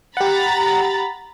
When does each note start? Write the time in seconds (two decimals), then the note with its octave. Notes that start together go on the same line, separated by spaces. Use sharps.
0.17 G4 F#5 A#5 B5 A6